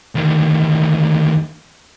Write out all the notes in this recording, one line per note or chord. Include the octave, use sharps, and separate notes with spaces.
D2 D#3